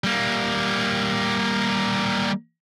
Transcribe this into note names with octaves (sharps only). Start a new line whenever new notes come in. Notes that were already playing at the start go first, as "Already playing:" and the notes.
G3 A#3